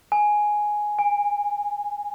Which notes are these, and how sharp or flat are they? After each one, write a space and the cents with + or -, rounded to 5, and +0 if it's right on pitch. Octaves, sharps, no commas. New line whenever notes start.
G#5 +5
G#5 -25